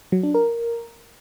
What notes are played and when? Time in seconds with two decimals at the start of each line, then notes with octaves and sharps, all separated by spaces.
0.12 F#3
0.23 D4
0.35 A#4